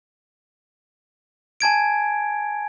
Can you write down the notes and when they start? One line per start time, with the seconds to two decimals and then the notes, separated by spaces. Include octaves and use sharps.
1.60 G#5 A5 G#6 D7